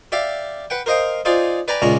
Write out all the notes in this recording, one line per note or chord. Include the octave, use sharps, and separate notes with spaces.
G4 D5 E5 F5
B4 F#5 G5
A#4 C5 D#5 F5 G5
D#4 F4 G#4 C5 D5
B4 D5 G5 G#5 A#5 B5
C#2 A#2 G#3 C#4 D4 A#5